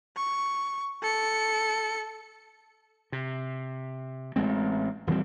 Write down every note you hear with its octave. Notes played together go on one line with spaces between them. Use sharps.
C#6
A4 C#7
C3
A1 G#3 C4
D#1 E3 G3 C4